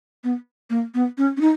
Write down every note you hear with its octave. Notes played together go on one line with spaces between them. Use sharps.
B3
A#3
B3
C#4
C#4
D#4